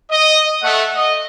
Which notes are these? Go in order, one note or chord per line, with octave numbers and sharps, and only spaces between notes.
D#5
A3 F#5
D#5